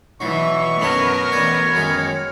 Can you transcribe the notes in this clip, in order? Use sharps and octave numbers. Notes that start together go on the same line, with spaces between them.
B2 E3 F#3 C#6
F#2 B3 A#4 C#5
A1 C#5 D5
F#2 D#3 G#3 F6